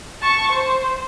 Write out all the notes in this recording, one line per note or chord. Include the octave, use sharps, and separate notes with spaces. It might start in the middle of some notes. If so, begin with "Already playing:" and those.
A5 C#6
C5